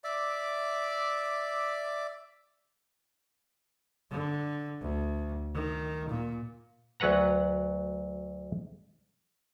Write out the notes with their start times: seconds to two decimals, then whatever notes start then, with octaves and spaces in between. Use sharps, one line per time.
0.04 D5 E5 D6
4.11 D3
4.81 D2
5.55 D#3
6.10 A#2
7.00 D2 F#3 B4 F#5 A#5